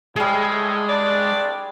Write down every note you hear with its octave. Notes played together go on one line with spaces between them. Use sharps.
A2 G3 G#3 G#4
C2 D4 D5